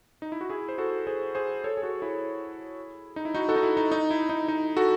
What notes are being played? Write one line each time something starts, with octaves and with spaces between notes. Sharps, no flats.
D#4
E4
F#4
E4 G#4
C5
F#4 A4
G#4 C5
G#4 C5
A4 C#5
G#4
F#4 A4
E4 G#4
D#4
E4
D#4 F#4
F#4 A4
D#4
E4
D#4
D#4
E4
D#4
D#4
F#4 A4